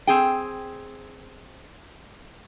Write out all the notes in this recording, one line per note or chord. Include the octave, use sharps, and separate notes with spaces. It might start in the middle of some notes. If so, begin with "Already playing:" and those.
C4 G#4 G5